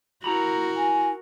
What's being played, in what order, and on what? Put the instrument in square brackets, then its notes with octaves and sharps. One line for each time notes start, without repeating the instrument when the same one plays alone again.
[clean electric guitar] E4 A#5 B5 [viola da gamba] F#4 A#4
[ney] G#5